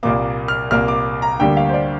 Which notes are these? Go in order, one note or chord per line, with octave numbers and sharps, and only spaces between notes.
C2 A#2 A#3 D6
F6
C2 A#2 A#3 F6
D6
A#5
D2 D3 G3 A#3 G5
F5
C5
D5